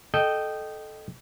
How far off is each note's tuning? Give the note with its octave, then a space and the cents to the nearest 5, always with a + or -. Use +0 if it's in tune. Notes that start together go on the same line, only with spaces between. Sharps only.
A4 -15 D#5 -15 G5 -10